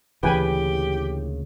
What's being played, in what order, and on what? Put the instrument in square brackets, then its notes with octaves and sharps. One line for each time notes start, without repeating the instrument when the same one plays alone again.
[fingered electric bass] D2 A#2 C#3 [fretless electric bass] E3 [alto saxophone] G4 [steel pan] B4 G5 G#5